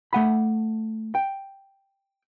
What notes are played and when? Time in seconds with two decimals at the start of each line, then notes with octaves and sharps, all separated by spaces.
0.13 A3 F#5 B5
1.15 G5